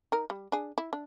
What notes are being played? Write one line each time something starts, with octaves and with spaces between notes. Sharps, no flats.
D#4 A#4
G3
D4 G#4
E4
D4